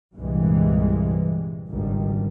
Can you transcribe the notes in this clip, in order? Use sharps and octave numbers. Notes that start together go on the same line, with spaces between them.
C2 G2 A#2 E3 G3 G#3
G#1 C#2 G2 D3 D#3 G3